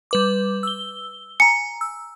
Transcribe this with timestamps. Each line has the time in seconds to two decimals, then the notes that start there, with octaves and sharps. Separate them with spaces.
0.11 G3 B4 D6
0.63 E6 G7
1.40 G#5 A#5 C#7
1.81 E6